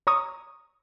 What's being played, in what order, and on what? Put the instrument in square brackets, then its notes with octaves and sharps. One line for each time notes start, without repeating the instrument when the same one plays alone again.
[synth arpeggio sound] C#5 A#5 C#6 D#6